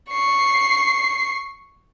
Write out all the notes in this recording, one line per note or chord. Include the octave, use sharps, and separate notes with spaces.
C#6 C7